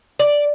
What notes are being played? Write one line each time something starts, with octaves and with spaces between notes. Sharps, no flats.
D5